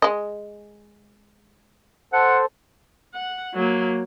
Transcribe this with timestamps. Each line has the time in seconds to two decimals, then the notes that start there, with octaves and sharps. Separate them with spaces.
0.02 G#3 D#5
2.13 A4 C5 F#5
3.14 F#5
3.55 F#3 A#3